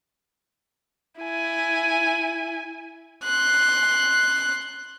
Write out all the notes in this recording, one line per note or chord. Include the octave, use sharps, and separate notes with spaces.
E4 G#5
C6 F#6